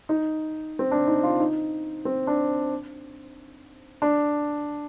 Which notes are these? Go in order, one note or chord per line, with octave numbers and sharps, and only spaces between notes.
D#4
C4
D4
D#4
F4
D#4
C4
D4
D4